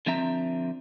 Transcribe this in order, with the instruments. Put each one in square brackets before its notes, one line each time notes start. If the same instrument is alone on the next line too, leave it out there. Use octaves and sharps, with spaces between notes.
[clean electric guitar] D3 F3 C4 E5 A#5